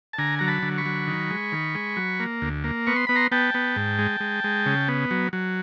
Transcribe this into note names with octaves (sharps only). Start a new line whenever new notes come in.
A5
D3 G#5 A#5
F#3 A#5
A5 B5
D3
B5 C#6
F#3
D#3
G#3
D#3
G#3
F#3
A#3
D2
A#3
B3 C#6
C6
B3 B5
A#5 C6
B3 G5 A5
B3
G#2
G#3
G#3
G#3
C#3
B3
F#3
F#3